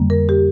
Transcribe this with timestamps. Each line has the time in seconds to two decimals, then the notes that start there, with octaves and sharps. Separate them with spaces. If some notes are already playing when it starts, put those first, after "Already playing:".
Already playing: F2 D3 G3 A#3
0.10 A#4
0.29 G4